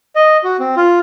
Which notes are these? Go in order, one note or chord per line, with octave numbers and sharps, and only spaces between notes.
D#5
F#4
C4
F4